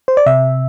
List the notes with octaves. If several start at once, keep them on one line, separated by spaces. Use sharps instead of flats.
C5
D5
C3 E5